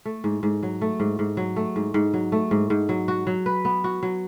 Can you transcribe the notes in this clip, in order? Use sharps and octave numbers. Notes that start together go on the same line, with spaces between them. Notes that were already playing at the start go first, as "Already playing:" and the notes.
A3
G#2
G#2
F#3
A3
G#2
G#2
F#3
A3
G#2
G#2
F#3
A3
G#2
G#2
F#3
F#4
F#3
B4
B3
F#4
F#3